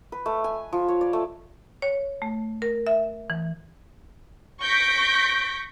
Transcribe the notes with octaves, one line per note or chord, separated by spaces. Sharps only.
B4
A3
G#5
F3
C#5
D5
A3
C#5
A3
A#4
E5
E3
C#6 G6 A#6 B6 D7